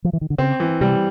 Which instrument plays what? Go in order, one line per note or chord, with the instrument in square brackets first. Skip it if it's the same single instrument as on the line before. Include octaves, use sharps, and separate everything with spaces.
[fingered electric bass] F3
E3
D#3
D3
[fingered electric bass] C#3 [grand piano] C4
[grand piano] E3
[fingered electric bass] C3 [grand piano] G3